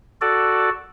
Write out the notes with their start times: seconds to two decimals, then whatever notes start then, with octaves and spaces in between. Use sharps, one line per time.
0.21 F#4 A4 D5